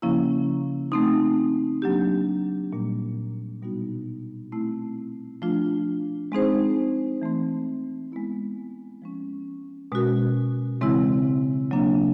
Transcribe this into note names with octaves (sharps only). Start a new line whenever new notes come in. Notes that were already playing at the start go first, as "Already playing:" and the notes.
C#3 F3 A#3 C#4 E4
A3 C4 D#4
F#3 A#3 D4 G4
A#2 G3 A#3
B2 G3 B3 D#4 F#4
A3 C4 E4
F3 A3 D4 F4
G#3 C4 D#4 G#4 C5
E3 A3 C4
G#3 B3 E4
F3 G#3 C#4
B2 G#3 C#4 F#4 A#4
C#3 E3 G#3 C4 E4
C#3 F#3 A#3 D4